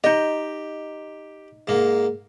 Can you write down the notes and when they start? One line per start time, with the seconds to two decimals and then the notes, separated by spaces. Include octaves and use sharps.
0.04 D#4 G4 D#5
1.67 G#2 A#3